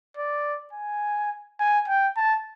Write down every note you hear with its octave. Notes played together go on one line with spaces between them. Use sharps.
D5
G#5
G#5
G5
A5